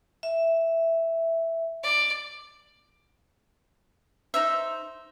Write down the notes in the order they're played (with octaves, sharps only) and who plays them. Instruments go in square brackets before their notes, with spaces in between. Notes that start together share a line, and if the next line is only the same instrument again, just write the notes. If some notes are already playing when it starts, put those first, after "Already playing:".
[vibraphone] E5
[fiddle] D5
[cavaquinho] D#4 C5 E5